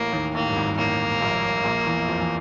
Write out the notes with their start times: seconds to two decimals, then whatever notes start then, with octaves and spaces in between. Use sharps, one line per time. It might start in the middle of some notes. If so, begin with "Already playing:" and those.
Already playing: A1 A2 A#3
0.12 D#2 D#3
0.34 A1 A2 A#3
0.49 G2
0.56 G#1 G#2
0.78 A1 A2 A#3
1.21 A#1 A#2
1.64 A#1 A#2
1.86 E2 E3
2.08 F2 F3
2.20 E3